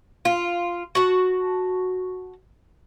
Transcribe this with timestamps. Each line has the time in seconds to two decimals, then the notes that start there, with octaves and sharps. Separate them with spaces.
0.25 F4
0.95 F#4 A5